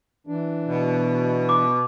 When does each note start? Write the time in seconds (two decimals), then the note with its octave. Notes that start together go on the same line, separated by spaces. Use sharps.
0.27 E3 D4
0.68 B2
1.49 D6